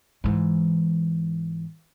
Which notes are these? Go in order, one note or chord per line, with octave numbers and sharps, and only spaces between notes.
G#2 E3